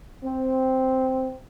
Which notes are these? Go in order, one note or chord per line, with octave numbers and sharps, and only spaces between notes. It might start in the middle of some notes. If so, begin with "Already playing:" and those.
C4